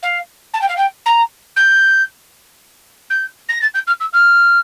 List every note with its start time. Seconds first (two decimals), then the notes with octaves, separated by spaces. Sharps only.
0.02 F5
0.53 A5
0.61 G5
0.68 F5
0.77 G5
1.06 A#5
1.56 G6
3.10 G6
3.48 A#6
3.61 A6
3.74 G6
3.87 F6
4.00 E6
4.13 F6